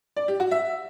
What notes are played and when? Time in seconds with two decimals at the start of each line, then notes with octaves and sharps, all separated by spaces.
0.16 D5
0.28 G4
0.40 F#4
0.51 E5